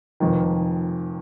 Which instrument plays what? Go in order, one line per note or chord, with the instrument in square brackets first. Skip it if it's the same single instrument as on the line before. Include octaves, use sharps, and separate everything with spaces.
[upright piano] F1 F2 D#3